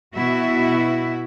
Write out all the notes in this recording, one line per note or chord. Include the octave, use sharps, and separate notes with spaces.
B2 B3 E4 F#4 E5